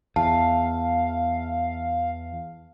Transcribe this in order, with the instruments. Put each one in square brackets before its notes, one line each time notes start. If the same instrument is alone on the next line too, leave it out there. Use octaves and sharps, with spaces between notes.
[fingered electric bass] E2 [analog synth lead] F5 [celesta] A5